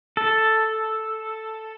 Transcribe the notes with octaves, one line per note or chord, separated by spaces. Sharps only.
A4